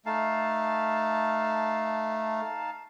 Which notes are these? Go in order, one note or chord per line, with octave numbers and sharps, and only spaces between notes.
A3 D#4 F5 A5